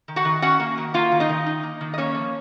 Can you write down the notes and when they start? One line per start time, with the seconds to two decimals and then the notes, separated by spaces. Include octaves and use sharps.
0.08 D#3
0.16 F#4 F#5
0.25 D#3
0.42 C#4 F#4 F#5
0.60 A#3
0.78 D#3
0.94 A#3 F4 F5
1.12 D#3
1.20 D#4 D#5
1.29 D#3
1.46 D#4
1.63 A#3
1.81 D#3
1.94 D#5
1.98 A#3 C#4 C#5
2.15 F3